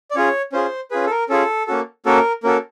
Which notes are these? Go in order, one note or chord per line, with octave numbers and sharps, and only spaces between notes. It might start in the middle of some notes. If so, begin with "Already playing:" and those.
D5
C#4 F4 G#4 C#5
C#4 F4 G#4 C5
C#4 F4 G#4 B4
A4
A#4
C#4 F4 G#4 A4
A#3 C#4 F#4 A4
A#3 C#4 F#4 A4 A#4
A#3 C#4 F#4 A4 A#4